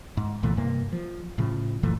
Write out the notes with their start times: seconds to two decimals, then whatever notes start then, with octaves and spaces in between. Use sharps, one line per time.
0.17 G#2
0.43 C2 A#2 E3 A3
0.57 G2 C3 A#3
0.93 F3
1.38 A2 C#3 F3
1.83 F#1 A#2 E3 A3